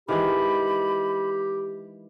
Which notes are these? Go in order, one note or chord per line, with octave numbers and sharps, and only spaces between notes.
D#3 E3 G#3 G4 B5